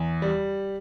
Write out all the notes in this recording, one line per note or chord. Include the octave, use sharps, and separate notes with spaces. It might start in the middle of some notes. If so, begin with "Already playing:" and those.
Already playing: E2
G3